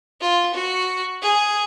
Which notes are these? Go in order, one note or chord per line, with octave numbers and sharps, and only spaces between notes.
F4
F#4
G#4